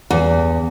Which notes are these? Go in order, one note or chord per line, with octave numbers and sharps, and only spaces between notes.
E2